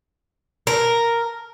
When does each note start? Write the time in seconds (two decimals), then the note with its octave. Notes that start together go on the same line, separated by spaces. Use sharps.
0.67 A#4